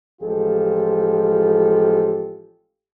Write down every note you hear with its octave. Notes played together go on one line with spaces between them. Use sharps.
A1 F3 G#3 F4 G4 A4